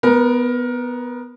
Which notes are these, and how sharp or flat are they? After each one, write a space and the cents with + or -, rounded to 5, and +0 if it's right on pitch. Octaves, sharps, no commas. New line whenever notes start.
B3 +0 A#4 +25